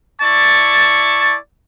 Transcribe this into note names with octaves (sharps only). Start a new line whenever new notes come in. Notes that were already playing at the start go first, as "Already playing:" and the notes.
E4 D5 A5 C#6